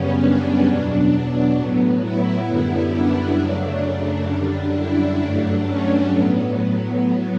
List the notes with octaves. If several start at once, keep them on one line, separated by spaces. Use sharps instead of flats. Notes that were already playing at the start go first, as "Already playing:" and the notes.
Already playing: F#2 C#3 G3 B3 C#4
D4
E2 B2 F#3
A2 F#3 B3
E4
F#2 D3 G3 B3 E4
D4
F#2 C#3 F#3 A3
F#2 D3 G3 D4
E4
G2 F#3 A3 D4
C#4
A2 F#3 B3
A2 F#3 B3